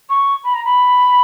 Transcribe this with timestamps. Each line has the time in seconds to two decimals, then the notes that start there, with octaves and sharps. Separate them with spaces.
0.09 C#6
0.44 B5
0.54 A#5
0.65 B5